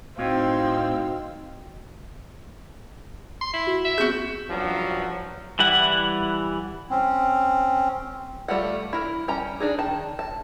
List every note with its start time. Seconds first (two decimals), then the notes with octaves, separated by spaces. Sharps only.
0.18 A2 C4 D#4 F#4 D#5 F5 G5 E6
3.41 C6
3.53 E4
3.67 F#4
3.84 E5
3.98 B3 C4 F#4 G#4 G6
4.49 A1 G2 F3 F#3
5.59 E3 G3 E4 F#5
6.90 C4 C#4
8.48 G3 A3 F4 F#5
8.93 E4 A#4
9.28 G3 C#4 A#5
9.60 D4 D#4 G#4
9.78 D#3 A5
10.19 A5